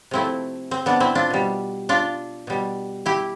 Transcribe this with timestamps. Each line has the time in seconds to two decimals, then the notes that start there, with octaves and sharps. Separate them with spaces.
0.11 C3 F3 A3 C4 E4
0.71 C4
0.86 B3 D4
1.00 C4 E4
1.15 D4 F4
1.30 B2 G3
1.89 D4 F4
2.47 B2 G3
3.06 E4 G4